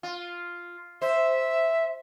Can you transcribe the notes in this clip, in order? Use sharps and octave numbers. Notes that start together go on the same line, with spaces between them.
F4
C5 E5